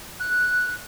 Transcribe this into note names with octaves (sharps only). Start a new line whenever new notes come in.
F#6